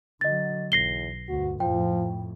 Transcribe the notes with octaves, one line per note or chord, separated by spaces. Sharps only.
D3 F#3 D#5 A6
B1 E2 A#6 C7 G7
D2 G2 F#4
F2 A2 F3 G5